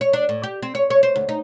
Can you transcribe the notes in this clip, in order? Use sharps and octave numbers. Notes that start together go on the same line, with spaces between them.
C#5
D4
A2
G4
C4
C#5
C#5
C5
D2
D#4